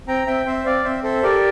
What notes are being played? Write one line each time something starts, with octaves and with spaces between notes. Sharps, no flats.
C4 G5 A#5
C4 E5 G5
C4 C5 E5
C4 D5 F5
C4 C5 E5
A4 C5 E5
G4 A#4 D5